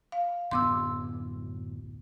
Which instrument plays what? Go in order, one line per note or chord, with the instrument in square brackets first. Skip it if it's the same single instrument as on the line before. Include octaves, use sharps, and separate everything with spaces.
[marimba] F5
[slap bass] D1 F#2 B3 [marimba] C6 D6 E6